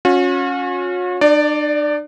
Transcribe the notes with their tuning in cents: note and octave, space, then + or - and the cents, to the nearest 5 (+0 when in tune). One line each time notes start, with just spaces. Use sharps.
C#4 +0 F#4 -45
D4 +45 D5 +0